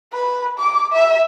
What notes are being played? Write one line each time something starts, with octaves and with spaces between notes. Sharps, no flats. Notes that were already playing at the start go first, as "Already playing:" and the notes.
B4
D6
E5